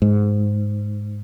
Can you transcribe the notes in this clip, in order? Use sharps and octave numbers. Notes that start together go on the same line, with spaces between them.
G#2